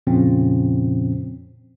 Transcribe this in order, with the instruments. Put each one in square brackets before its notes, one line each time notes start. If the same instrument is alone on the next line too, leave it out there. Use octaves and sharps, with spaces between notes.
[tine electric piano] F2 A#2 C#3 F3 C4 C#4